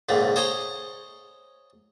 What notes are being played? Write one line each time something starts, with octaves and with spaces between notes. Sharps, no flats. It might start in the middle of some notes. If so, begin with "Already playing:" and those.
A#1 G#2 C#3 A3
C5 C#5 D#5 G#5 A#5 C#6